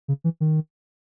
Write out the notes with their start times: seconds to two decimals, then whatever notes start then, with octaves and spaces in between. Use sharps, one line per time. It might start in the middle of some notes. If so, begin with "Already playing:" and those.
0.08 C#3
0.24 E3
0.40 D#3